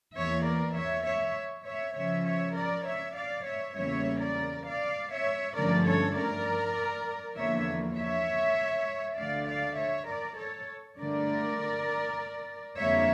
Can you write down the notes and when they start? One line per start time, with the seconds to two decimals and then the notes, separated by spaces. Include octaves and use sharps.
0.15 E2 E3 A#3 C#5 E5
0.45 A#4 D5
0.75 C#5 E5
1.05 C#5 E5
1.66 C#5 E5
1.95 C#3 F3 C#4 C#5 E5
2.26 C#5 E5
2.56 A#4 D5
2.86 C#5 E5
3.15 D5 F5
3.46 C#5 E5
3.76 E2 C#3 G3 A#3 C#4 C#5 E5
4.21 A#4 D5
4.66 D5 F5
5.11 C#5 E5
5.56 G2 D3 F3 A3 C#4 A#4 D5
5.86 A4 C#5
6.16 A#4 D5
7.37 E2 D3 F3 A#3 C#5 E5
7.97 C#5 E5
9.17 D2 D3 A3 D5 F5
9.47 D5 F5
9.77 C#5 E5
10.08 A#4 D5
10.37 A4 C#5
10.98 G2 D3 A3 A#4 D5
12.78 F2 D3 G3 A#3 C#5 E5